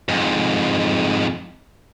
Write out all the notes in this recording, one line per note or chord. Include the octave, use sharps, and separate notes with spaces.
F2 G#2